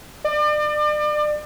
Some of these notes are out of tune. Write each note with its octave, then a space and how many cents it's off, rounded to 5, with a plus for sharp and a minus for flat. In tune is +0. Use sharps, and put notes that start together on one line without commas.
D5 +35